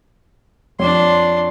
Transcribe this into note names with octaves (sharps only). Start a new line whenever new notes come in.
F2 D4 C#5 C6